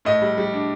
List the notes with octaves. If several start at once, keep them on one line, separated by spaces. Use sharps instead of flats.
A2 D#5
G3
G3
D4